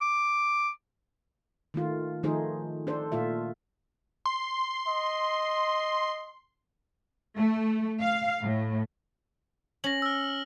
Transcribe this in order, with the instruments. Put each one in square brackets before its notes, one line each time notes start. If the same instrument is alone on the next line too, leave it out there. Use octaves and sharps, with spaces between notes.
[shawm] D6
[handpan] D#3 A3 F4
D#3 F3 A3 D#4 G#4 C5
D4 A4 C5
A#2 A3 F4 E5
[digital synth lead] C6
[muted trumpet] D#5
[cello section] A3
F5
A2
[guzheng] C#4 [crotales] A#6 F#7
[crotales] E6 F6